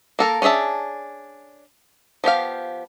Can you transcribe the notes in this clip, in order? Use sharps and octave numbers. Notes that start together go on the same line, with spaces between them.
A#3 A4 A#4
C#4 D4 G#4 E5 A5
F3 B3 G4 F5